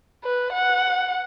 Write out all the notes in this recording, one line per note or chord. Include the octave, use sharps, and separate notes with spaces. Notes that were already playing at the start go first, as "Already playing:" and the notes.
B4
F#5